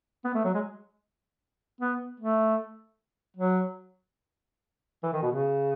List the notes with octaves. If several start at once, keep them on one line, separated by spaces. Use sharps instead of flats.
B3
A3
F#3
G#3
B3
A3
F#3
E3
D#3
B2
C#3